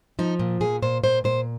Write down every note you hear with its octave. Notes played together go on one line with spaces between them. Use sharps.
F3 D#4
A#2
A#2 G#4
A#2 C5
A#2 C5
A#2 C5